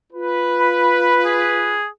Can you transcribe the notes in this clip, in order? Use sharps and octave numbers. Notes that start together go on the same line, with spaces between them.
F4 B4
B5
G#4